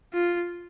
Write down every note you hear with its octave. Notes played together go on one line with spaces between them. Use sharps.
F4